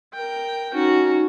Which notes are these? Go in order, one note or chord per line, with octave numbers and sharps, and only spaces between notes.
A#4 G5
C#4 D#4 F#4